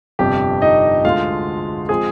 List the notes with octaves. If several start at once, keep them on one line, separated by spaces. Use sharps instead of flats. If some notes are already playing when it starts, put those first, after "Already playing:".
G1 F2 C3 G3 D4 G4
D#4 D#5
D2 D3 G#3 D4 F4 F5
F3 G#3 C4 G#4 G#5